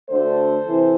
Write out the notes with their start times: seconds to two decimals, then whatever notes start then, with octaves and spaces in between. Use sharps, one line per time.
0.10 D2 D3 A3 A4 C5
0.67 C3 E3